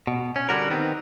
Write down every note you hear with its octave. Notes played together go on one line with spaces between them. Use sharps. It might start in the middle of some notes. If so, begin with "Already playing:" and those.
B2
C#4
D3 G3 F#4 A#4
D#3 B3 C4